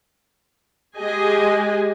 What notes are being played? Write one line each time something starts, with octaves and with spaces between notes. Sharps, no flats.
G#3 G4 G#4 D#5 G#5